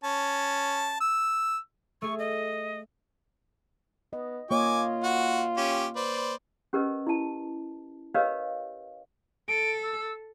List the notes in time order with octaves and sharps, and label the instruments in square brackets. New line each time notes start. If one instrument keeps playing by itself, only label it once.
[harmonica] C#4 A5
E6
[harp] A3 G#4 [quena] C#6
[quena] D#5
[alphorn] B3 [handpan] D#5
[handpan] A#3 C#5 D#5 [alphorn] F4 [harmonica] G#5 D6
[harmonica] F#4 F#5
C#4 G4
B4 C5 D5
[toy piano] C#4 G4 A#4 B4 D#5
E4 A5
G4 A#4 B4 C#5 D#5 F5
[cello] A4 [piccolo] D7
[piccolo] E6